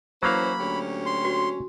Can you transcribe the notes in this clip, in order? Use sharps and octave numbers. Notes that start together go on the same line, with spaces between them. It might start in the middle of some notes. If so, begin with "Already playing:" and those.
E3 F#3 A#3 C#4 C5 F5 B5
D2 C#4 G4
C6
F#4